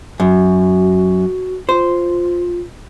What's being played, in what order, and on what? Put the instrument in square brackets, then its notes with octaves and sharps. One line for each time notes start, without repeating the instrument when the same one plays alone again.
[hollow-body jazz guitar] F#2 [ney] F#4
[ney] F4 [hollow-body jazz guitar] C5